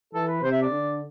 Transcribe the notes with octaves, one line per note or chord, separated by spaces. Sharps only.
E3 A4
B4
C3 C5
E5
D5
D3